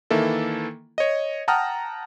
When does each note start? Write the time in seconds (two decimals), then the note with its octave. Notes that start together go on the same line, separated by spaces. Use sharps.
0.10 D#3 E3 A#3 E4 A4
0.98 C#5 D#5
1.48 F#5 G5 A5 A#5 D#6 F6